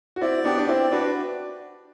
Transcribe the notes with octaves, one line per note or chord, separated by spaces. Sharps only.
F#4
C4 E4 D5
B3 D4 G4
D4
C4 E4 D5
D4 F#4 B4